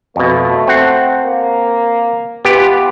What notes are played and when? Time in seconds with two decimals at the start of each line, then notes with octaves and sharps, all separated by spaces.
0.16 F2 B2 A3
0.67 C4 F#5
1.24 A#3
2.45 E3 B3 F4 G4